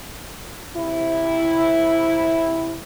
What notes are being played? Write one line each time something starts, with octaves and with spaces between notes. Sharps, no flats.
C3 E4